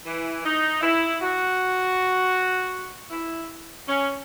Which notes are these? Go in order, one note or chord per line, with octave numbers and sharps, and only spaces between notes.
E3
D#4
E4
F#4
E4
C#4